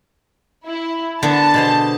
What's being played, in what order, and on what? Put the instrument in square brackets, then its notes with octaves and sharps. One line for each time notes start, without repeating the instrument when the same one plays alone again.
[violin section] E4
[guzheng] D3 B3 [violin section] A5
[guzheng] B2 G#4 C5